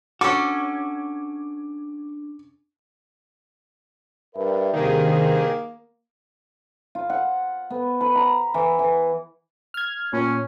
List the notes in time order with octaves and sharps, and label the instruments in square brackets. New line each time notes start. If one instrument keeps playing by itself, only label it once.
[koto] C#4 A4 [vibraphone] D4 [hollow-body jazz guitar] F#4 [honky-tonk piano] D6
[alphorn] G2 [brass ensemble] A#4 B4 E5
[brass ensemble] G2 C3 [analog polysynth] D#3 G#4 [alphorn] A#3
[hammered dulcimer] F4
F#5
B3
B4
A#5
E3
E3
[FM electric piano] F6 G#6
[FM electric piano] A#2 [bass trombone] C#4